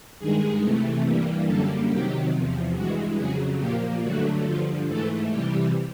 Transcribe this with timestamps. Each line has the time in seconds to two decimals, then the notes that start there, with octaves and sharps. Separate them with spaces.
0.19 G2 D#3 G#3 G#4
0.62 C3 E3 A3
1.04 G2 E3 G3 A#3
1.47 F#2 D3 G3 A#3 A4
1.89 C3 D#3 F#3 G4
2.32 E2 C3 F3
2.74 G2 E3 G#3 F#4
3.17 F2 C#3 F#3 G#4
3.60 A#2 F3 A#3 G4
4.02 G2 D3 F#3 A3 F#4
4.45 G2 D3 F3 F4
4.87 G#2 E3 A3 A4
5.30 C3 E3 G3 G4